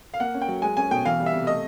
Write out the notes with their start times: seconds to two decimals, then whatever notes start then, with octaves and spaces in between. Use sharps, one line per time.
0.14 F5
0.20 A#3 F#5
0.34 C#4
0.42 G5
0.48 F#3
0.62 G#3 G#5
0.77 C#4 G#5
0.91 B2 G5
1.05 E3 F5
1.20 G3
1.26 E5
1.33 C3
1.47 A3 D#5